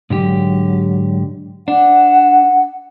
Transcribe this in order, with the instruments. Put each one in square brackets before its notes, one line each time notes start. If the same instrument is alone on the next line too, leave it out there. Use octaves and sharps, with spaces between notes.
[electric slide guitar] G#2 D3 G4 [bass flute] F#3
[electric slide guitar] D4 [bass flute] F#5